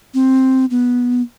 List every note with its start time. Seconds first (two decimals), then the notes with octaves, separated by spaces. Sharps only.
0.14 C4
0.71 B3